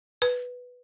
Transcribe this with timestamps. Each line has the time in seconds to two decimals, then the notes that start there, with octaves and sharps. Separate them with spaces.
0.22 B4